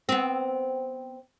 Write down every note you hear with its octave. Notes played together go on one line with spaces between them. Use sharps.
B3 C4